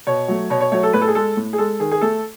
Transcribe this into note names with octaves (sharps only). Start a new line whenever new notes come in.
B2 C#5
F#3 A3
B2 C#5
C#5
F#3 A3 C#5
A4
A2 B4
A4
G#4
G#3 A4
A2
G#4
G#3 A4
D#3 G#4
G#4
A3 A4